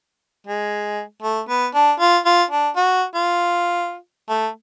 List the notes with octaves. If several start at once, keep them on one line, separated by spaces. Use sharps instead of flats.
G#3
A3
B3
D4
F4
F4
D4
F#4
F4
A3